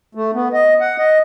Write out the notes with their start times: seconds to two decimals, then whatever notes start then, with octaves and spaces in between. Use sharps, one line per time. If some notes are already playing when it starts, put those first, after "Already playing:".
0.15 A3
0.34 B3
0.53 D#5
0.80 F#5
0.99 D#5